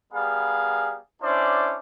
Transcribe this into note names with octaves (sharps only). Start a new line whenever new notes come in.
G3 B3 G#4 A#4 F5
C#4 D4 E4 C5 D5